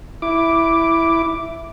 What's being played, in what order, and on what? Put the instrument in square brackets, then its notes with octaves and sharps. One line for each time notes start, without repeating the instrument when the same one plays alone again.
[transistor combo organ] E4 D6